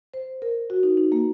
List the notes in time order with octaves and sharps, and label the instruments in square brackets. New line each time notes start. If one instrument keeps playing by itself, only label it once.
[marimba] C5
A#4
F#4
D#4
D#4
A#3